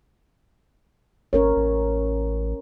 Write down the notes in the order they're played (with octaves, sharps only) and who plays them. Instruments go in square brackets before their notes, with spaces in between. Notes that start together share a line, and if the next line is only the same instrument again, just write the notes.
[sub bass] G#1 [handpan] C#4 A#4 C#5
[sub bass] A1